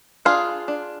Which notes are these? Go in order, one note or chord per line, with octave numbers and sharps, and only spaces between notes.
D4 F4 G#4
D4